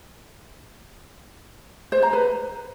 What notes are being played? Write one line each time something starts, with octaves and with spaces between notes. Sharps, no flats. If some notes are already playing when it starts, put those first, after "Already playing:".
C5
A#5
B4